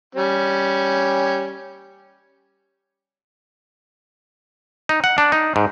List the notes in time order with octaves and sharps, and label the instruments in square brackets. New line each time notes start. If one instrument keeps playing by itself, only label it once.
[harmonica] G3 C#4
[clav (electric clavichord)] D#4
F#5
D4
D#4
G#2